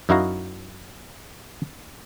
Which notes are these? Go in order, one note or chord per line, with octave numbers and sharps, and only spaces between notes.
F#2 D#4 E4 F#4 F5 A#5